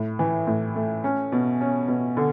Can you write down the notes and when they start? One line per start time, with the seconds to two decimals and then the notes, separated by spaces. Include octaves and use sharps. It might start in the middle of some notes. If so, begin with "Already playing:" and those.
Already playing: A2
0.19 E3
0.47 A2
0.75 A3
1.04 C#4
1.32 B2
1.61 C#4
1.88 B2
2.17 D3